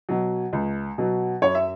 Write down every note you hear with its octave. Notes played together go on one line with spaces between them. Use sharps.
B2 F#3
C#2
B2 F#3
F#2 C#5
E5